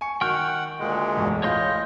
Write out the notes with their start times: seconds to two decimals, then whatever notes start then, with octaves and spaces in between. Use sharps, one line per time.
0.01 G#5 C#6 C#7
0.21 D#3 F#4 F#5 G5 C#6 F6 G6
0.80 D2 A#2 G#3
1.16 B1 E2 G#2
1.43 A2 E3 F4 C#5 D#5 C6 G6